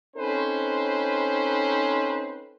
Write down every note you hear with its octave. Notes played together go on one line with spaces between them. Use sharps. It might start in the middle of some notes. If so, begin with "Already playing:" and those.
C4 C#4 D#4 A4 B4 C5